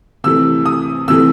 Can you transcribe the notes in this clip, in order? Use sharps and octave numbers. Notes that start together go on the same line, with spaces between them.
C3 E3 A3 E6
D#6
C3 E3 A3 E6